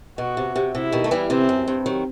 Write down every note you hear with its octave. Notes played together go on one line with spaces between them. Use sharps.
B2 F#4
C3
C3
C3 E4
B2 D#3
A3
E3 G3
C3 E3 C4
F#2
G2
D#3 F#3